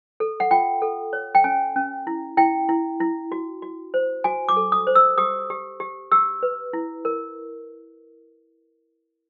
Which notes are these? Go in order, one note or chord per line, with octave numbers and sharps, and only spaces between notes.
A4
F#5
F4 G5
A4
C#5
G5
C#4 G#5
C#4
E4
E4 G5
E4
E4
F#4
F#4
C5
F#4 G#5
D6
A4
D#6
C5
E6
G4 D#6
G4
G4
G4 E6
B4
E4
A#4